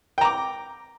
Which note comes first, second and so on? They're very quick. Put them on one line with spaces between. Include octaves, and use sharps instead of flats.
G5 A#5 D6